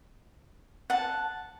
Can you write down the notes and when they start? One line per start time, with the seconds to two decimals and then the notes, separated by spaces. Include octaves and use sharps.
0.90 F#5 A5